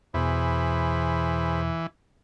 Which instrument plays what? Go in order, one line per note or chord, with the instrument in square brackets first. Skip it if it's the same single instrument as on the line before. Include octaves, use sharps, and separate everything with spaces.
[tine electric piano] E2 B2 [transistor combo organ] E3 [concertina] G#4 C5 B5